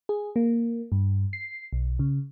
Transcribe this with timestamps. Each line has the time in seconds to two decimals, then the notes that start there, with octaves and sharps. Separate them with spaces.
0.09 G#4
0.36 A#3
0.92 G2
1.33 C7
1.73 B1
1.99 C#3